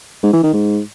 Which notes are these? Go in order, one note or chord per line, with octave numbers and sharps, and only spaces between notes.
G#2
E3
D#3
G#2